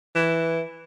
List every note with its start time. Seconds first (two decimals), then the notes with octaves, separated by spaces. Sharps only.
0.16 E3